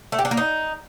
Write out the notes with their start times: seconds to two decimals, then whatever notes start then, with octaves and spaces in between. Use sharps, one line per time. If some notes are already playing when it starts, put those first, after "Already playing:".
0.12 A3
0.19 G4
0.25 D4
0.31 A#3
0.37 D#4